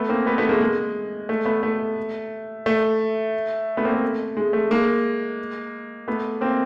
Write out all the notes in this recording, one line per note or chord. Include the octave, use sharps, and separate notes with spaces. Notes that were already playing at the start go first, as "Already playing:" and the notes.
Already playing: A3 B3
A#3 C4
A3 B3
A3 B3
G#3 A#3
G#3
A3
A3 B3
A3
A3
A3 B3
A#3 C4
A3
G#3
A3
G#3 A#3
A3 B3
A#3 C4